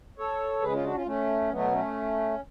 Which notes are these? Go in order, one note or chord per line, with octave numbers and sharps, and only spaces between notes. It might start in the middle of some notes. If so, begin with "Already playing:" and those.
A4 C#5
C#3 G#3 G#4 B4
C#4 F4
D4 F#4
C#4 F4
A3 C#4
B2 F#3 A3 B3
A3 C#4